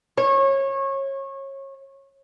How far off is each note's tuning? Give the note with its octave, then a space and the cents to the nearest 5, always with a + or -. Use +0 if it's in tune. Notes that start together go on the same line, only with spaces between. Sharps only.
C#5 -25